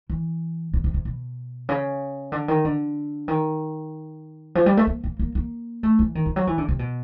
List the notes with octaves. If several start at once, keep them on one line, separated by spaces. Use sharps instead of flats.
E3
B2
C3
C3
B2
C#3
D3
D#3
D3
D#3
F3
G3
A3
A#3
A#3
A#3
A#3
A3
E3
D#3
F3
F#3
E3
D3
C3
B2